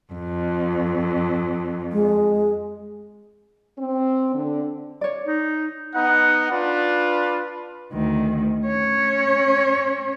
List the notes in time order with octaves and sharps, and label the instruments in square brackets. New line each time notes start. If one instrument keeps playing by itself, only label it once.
[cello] F2
[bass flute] G#3
[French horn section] C4
D3
[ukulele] C#5 D5
[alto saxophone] D#4
[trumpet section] B3 D#4 F#5
D4 F4 B4
[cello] D2 D#3
C#4 C#5